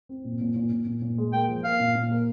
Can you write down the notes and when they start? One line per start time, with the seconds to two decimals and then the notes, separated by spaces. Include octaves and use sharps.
0.09 C4
0.24 A#2
0.41 A#2
0.56 A#2
0.72 A#2
0.87 A#2
1.02 A#2
1.18 G#3
1.33 A#3 G5
1.49 F3
1.64 A#3 F5
1.80 A#2
1.95 A#2
2.11 A#3